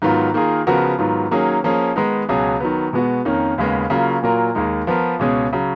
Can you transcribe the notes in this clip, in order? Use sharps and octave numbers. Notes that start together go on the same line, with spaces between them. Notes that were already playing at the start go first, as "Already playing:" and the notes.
G#2 D#3 F#3 B3 F4
D#3 A#3 F4 G#4
C#3 F3 B3 F#4 A#4
G#2 D#3 F#3 B3 F4
D#3 F#3 A#3 C#4 G#4
F3 A#3 C#4 G#4
D#3 G#3 B3 D#4
C#2 B2 F#3 C#4 G#4
D#3 F#3 B3
B2 G#3 B3 F#4
F2 D#3 A#3 C#4
D#2 C#3 G#3 B3
C#3 F#3 A#3 F4
A#2 F#3 A#3 F4 A#4
D#2 D#3 G#3 D#4
F3 B3 F4 A#4
C#2 B2 G#3 C#4 G#4
C#3 F#3